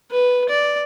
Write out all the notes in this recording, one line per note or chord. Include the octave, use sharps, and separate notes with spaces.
B4
D5